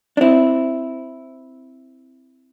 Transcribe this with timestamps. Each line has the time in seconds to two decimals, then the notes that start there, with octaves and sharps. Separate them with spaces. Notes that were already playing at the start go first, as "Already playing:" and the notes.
0.17 D4
0.21 C4 E4